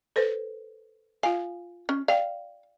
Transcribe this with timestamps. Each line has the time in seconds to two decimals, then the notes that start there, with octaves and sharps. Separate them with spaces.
0.16 A4 B4 C5
1.23 F4 F5 G#5
1.89 C#4
2.08 D5 F5 G5